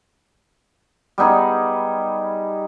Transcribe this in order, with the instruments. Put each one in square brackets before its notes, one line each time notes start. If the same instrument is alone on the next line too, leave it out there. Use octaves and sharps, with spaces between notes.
[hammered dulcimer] G3 B3 D#4 G#4